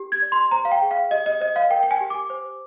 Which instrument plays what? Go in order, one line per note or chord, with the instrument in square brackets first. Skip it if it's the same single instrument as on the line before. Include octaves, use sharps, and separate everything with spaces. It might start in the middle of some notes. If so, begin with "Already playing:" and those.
Already playing: [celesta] G4
G#6
D5
C6
C5 A#5
F5
G5
G#4
F5
G4 D#5
D#5
C5 D#5
F5
A#4 G5
G5
G#5
G4
D6
C5